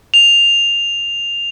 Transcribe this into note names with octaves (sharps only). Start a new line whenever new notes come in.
F7